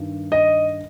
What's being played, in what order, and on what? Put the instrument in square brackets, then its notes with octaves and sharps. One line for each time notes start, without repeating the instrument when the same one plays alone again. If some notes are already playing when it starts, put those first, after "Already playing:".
Already playing: [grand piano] G2 D#3
D#5